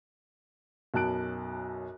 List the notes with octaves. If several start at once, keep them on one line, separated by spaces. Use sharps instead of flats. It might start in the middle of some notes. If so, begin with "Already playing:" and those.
B1 F#2 A5 F#6 D7